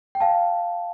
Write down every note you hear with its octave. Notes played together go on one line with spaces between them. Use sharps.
G5
F5 A5